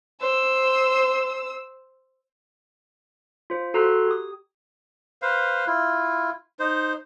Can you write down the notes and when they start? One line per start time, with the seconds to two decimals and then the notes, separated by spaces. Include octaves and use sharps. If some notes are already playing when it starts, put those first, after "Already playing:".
0.20 C5 E6
3.50 F4 C5
3.74 F#4 A4 A#5 C6 F#6 C7
4.07 G4 D#6
5.22 B4 C5 F5
5.67 E4 F4
6.59 D#4 C5